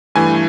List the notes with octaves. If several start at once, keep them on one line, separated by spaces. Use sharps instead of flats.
G2 E3 A3 G#5